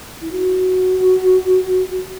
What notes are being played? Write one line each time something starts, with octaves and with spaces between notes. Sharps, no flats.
E4
F#4